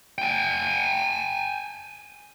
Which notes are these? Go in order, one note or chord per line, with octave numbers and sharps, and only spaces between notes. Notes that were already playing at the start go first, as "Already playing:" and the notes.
G5 G#5